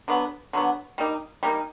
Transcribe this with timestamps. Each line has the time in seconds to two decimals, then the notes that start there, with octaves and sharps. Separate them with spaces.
0.08 D3 F#3 B3
0.53 D3 F#3 B3
0.98 G3 A#3 D#4
1.43 G3 A#3 D#4